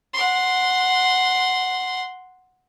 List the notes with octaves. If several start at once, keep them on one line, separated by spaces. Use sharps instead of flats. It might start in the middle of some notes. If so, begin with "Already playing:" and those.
F#5 C6